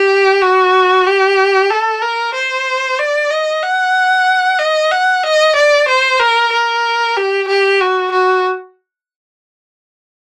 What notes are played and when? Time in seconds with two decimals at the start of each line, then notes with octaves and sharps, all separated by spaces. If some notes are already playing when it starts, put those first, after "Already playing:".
Already playing: G4
0.42 F#4
1.06 G4
1.71 A4
2.02 A#4
2.34 C5
2.99 D5
3.31 D#5
3.63 F#5
4.59 D#5
4.92 F#5
5.23 D#5
5.56 D5
5.88 C5
6.19 A#4
6.52 A#4
7.16 G4
7.48 G4
7.81 F#4
8.12 F#4